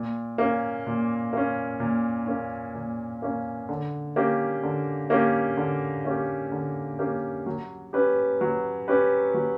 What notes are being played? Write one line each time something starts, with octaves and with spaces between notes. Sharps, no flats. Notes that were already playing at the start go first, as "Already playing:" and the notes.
Already playing: A#2
A#3 C#4
A#2
A#3 C#4
A#2
A#3 C#4
A#2
A#3 C#4
D3
A#3 C#4 G4
D3
A#3 C#4 G4
D3
A#3 C#4 G4
D3
A#3 C#4 G4
F#3
C#4 G4 B4
F#3
C#4 G4 B4
F#3